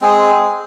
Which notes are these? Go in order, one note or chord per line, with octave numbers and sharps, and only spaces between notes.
G#3 C4 G#4